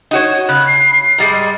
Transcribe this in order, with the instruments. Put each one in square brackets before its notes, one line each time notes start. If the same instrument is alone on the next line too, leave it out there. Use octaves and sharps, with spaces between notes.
[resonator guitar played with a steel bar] D#4 F#4 C#5
[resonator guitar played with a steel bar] C#3 [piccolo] F#6
[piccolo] C7
[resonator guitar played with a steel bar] G#2 G3 G#3